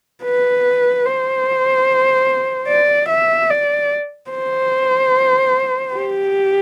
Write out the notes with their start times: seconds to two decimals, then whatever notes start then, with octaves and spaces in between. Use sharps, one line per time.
0.24 B4
1.06 C5
2.68 D5
3.09 E5
3.50 D5
4.31 C5
5.94 G4